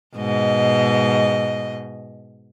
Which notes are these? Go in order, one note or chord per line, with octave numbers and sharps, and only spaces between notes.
G#2 B2 D#5